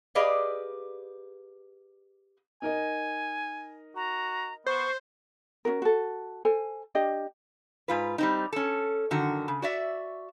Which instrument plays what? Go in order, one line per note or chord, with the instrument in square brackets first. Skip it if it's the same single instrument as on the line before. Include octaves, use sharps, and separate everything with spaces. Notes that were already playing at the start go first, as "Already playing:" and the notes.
[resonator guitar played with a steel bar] G4 G#4 B4 D5 D#5 F5
[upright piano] D#4 A#4 D#5 [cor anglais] G#5
[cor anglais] F#4 [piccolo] A#5
[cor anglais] B3 [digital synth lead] C5 [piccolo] C#6
[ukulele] C#4 D#4 F#4 A#4
F#4 A4
A4 C5 G#5
D4 G4 D#5
[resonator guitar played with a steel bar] G#2 F4 B4
G3 C4 D#4
C#4 A4
F#2 D3 D#3 F#4
C#3
F#4 D5 E5